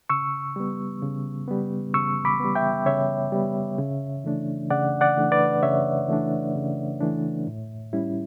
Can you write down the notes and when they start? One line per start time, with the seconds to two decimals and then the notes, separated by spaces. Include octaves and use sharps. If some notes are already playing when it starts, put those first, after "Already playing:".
0.10 C#3 C#6 E6
0.56 G3 B3
1.02 C#3
1.48 G3 B3
1.94 C#3 C#6 E6
2.25 B5 D6
2.40 G3 B3
2.55 E5 G5
2.86 C#3 C#5 E5
3.32 G3 B3
3.78 C#3
4.24 E3 A3 D4
4.70 C#3 D5 F#5
5.01 D5 F#5
5.17 E3 A3 D4
5.31 B4 D5
5.63 C#3 C#5 E5
6.09 E3 A3 D4
6.55 C#3
7.00 E3 A3 D4
7.47 A2
7.93 G3 C#4 E4